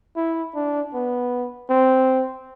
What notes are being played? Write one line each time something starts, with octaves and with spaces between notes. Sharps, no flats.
E4
D4
B3
C4